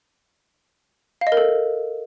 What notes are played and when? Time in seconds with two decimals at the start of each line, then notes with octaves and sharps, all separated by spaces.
1.21 F5
1.27 D#5
1.32 A#4
1.37 A4